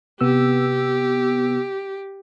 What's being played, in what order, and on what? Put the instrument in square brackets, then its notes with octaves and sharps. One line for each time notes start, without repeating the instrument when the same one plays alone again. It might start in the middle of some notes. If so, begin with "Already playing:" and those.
[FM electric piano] C3 B3 E6 [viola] G4